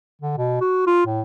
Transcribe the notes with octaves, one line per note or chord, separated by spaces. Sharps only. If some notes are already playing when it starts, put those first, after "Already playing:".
D3
B2
F#4
F4
A2